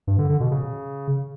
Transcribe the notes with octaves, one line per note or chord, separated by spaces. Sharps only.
G2
D3
D3
B2
C#3